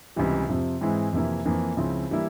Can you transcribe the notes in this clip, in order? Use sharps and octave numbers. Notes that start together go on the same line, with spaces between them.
C#2 C3 E3 G3
F2 C3 F3
G#2 E3 G#3 C4 E4
F2 C3 E3 A#3 E4
F2 E3 A#3
C#2 C#3 F3 C4 E4
E3 G3 A#3 E4